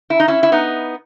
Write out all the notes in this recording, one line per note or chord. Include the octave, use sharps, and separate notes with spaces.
E4
D#4
C#4 E4
E4
B3 D#4